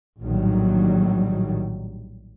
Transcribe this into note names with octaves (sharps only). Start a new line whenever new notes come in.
A#1 A2 D#3 F#3 G3